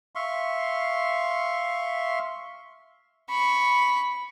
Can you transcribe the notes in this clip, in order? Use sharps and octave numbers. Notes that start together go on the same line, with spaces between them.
E5 F5 C6 C#6
B5 C#6